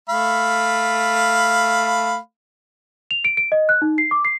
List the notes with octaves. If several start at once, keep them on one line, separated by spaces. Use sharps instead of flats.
A3 F5 B5
F7
D7
D7
D#5
F#6
D#4
C7
D6
C7